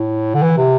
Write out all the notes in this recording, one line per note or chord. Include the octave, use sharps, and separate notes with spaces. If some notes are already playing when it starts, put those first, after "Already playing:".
Already playing: A2
D3
E3
C3